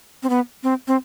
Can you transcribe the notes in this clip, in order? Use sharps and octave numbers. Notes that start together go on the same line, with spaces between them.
C4
B3
C4
C4